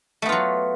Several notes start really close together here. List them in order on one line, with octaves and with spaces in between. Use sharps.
A3 B3 F4 F#3